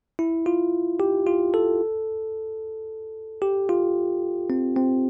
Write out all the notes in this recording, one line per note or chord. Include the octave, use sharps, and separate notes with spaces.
E4
F4
G4
F4
A4
G4
F4
C4
C4